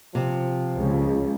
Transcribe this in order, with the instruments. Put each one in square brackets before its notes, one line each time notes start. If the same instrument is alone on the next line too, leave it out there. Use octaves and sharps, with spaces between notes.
[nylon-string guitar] C3 [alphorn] F3
[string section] C#2